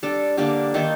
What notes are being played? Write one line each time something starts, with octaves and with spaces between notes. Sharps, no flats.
G3 D4 A4
D3 G3 A#3 D4
D#3 A#3 D#4 A4